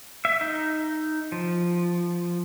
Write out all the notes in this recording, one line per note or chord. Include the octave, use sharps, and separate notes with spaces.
E5
D#4
F3